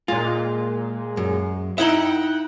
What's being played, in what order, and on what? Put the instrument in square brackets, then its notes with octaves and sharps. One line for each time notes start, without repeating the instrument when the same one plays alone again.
[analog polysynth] A#2 G#3 [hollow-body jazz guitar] F4
[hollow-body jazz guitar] F#2
[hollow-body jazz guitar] D#4 E4 E5 [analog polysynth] F#5 G5